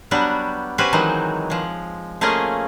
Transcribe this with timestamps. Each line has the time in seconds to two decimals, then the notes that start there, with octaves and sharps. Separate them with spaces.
0.11 F#3 G3 B3 D4 F#4 G4
0.78 C#4 F#4 G4 B4 C5 G#5
0.93 D#3 E3 F#3 G#3 C4 D#4
1.50 F3 G#3
2.21 A3 A#3 C#4 F4 G#4 D#5